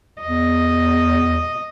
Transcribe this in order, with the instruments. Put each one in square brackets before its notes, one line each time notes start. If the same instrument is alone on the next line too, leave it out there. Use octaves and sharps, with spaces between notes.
[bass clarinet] E2 [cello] D#5